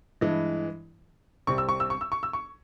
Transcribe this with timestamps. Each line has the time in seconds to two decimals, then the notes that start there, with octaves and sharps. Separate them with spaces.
0.21 G2 E3 G#3
1.47 C2 C3 G3 C4 C#6
1.58 E6
1.69 C#6
1.80 E6
1.90 C#6
2.01 E6
2.12 C#6
2.23 E6
2.33 C#6